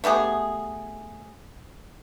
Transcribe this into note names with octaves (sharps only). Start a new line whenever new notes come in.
A3 B3 G4 G#4